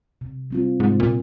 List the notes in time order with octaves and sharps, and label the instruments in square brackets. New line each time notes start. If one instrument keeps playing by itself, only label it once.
[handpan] C3
G3 C4 F4
[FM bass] G#2 [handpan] C3
[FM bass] A#2